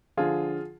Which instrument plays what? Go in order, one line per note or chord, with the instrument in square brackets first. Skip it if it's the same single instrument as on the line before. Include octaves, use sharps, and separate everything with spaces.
[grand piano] D3 F3 F4 G#4